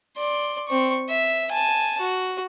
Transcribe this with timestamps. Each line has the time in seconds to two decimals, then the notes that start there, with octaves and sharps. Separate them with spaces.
0.18 D5 C6
0.68 C4 C#6
1.09 E5
1.52 G#5 A5
2.00 F#4